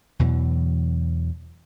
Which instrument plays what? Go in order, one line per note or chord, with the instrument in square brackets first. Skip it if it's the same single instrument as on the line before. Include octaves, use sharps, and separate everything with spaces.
[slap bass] E2 B2 E3 F#3